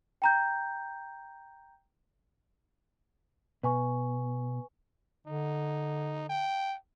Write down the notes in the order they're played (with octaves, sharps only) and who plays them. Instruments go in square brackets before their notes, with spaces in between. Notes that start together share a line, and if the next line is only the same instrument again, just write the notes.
[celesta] G5 A#5 G6
[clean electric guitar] B2 [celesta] B4 G#5 C#6
[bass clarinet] D3 [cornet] D#4
[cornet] G5